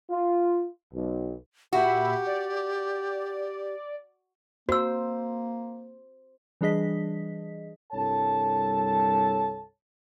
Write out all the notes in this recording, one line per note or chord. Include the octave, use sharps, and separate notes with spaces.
F4
B1
A#2 F#4 G4 E5 B5
D5
A#3 F#4 C5 E6
E3 G3 D4 G#4 D#5 B6
C2 G2 A4 C#5 A5